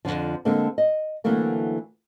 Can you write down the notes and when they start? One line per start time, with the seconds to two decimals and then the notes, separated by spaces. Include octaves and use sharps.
0.05 F2 A#2 D3 F3
0.45 D3 G#3 A#3 C4
0.78 D#5
1.24 D3 E3 F#3 A3 A#3 C4